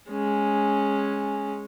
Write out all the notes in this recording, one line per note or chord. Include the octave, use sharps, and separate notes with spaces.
G#3 C#4